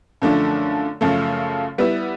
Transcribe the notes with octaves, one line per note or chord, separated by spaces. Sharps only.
F#2 D3 F3 A3 D4
F#2 C#3 F3 A3
G3 B3 E4